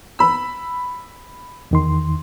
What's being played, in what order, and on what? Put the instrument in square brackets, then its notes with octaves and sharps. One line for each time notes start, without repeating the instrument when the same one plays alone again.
[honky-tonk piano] B5 E6
[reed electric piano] E2 D#3 C6